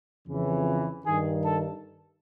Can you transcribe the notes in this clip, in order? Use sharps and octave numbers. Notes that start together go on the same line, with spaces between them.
F2 C#3 E3
G2 D#3 G#4
A4